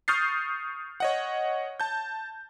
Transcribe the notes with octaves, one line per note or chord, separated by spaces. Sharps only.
C#6 D#6 F6 G6 A6 C7
C#5 D#5 F#5
A5 G6